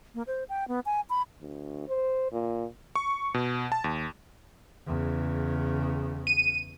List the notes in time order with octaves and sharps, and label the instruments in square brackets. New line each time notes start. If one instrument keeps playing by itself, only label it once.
[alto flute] A#3
C5
G5
B3
G#5
B5
[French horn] D2
C5
A#2
[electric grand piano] C#6
B2
A5
D#2
[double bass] E2 C#3
[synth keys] D#7